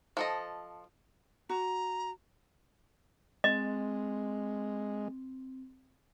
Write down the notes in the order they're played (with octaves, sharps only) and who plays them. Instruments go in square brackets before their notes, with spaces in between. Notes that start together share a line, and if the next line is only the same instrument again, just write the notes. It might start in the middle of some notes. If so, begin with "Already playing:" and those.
[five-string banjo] F3 A4 D#5
[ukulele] F#4 [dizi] A#5
[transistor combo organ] G#3 [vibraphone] C4 [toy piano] D#5